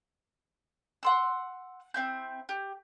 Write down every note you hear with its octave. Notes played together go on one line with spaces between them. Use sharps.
F#5 C6 E6
C4 E4 G6
G4